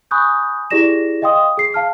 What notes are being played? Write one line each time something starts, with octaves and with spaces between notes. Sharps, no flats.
G#5 B5 C#6 D#6 F#6 G6
E4 G4 G#4 D5 A#6 E7
D#5 F5 G5 C6 D#6
G#4 C7
F5 A5 F6 C7